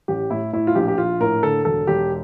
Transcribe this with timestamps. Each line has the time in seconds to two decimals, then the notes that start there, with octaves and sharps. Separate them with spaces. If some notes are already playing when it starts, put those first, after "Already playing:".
0.08 A1 G4
0.30 A2 E4
0.53 A2 E4
0.67 F4
0.75 A#1 G4
0.88 G4
0.98 A#1 F4
1.20 A2 A#4
1.43 D3 A4
1.65 E1 A4
1.87 E1 G4